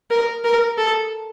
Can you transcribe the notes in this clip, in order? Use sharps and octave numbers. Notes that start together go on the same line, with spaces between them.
A#4
A#4
A4